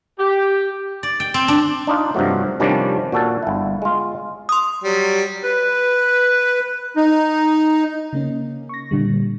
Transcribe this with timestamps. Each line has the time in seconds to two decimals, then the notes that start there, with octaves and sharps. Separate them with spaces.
0.19 G4
1.03 D5
1.20 G5
1.34 C4
1.48 D4
1.87 D4 D#4 F4
2.14 G2 C3 F3 F#3 A3
2.60 C3 D#3 F3 G3 C#4 D4
3.12 A#2 F#4 A4 A5
3.43 G1 E4
3.82 G#3 F4
4.49 C6 D#6
4.84 F#3 G3
5.43 B4
6.96 D#4
8.13 C#3 A#3 C#4
8.69 C#6 A#6
8.91 A#2 D3 G3